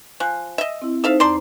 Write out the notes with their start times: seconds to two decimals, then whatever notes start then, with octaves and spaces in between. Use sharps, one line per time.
0.20 F3 G#5 F#6
0.58 D#5 E5
0.82 C4 E4
1.04 D#4 A4 C5 E5 F5
1.20 E2 C5 D5 A5 A#5 C6